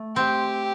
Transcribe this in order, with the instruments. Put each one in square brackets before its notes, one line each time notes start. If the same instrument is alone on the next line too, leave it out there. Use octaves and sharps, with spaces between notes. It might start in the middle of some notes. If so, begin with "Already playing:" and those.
Already playing: [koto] A3
[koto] C4 [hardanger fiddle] G4